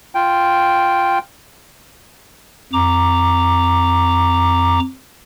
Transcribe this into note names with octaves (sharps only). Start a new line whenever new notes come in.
F4 G5
F2 A#5 D6